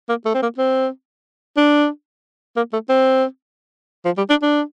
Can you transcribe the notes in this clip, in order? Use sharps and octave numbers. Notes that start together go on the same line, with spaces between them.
A#3
A3
C4
A#3
C4
D4
A#3
A3
C4
F3
G3
D4
D4